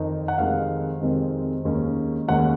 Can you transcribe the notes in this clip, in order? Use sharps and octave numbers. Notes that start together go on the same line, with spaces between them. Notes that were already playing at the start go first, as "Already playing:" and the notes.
Already playing: F2 D#3 C4 D#4
F#5
F2 C3 D#3 G#3 C4 F5
F2 C3 D#3 G#3 C4
D#2 D#3 G#3 C#4
D#2 D#3 G#3 C#4 F#5